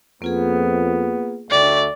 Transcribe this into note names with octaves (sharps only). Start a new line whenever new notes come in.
F2 A#3 B3 F4 G#4
D2 A3 D5 G5 C#6